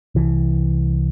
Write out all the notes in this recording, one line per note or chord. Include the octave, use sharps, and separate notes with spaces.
C2 E3